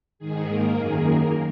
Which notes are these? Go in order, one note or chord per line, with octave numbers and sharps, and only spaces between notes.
G#2 D#3 G#4
A#3 A#4
F#2 D#3 G#4
A#3 A#4